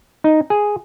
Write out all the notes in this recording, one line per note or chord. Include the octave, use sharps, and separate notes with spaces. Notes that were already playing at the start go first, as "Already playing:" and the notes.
D#4
G#4